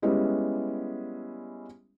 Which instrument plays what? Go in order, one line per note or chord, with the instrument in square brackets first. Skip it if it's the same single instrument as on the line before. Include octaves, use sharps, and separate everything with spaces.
[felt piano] G3 G#3 B3 C#4 E4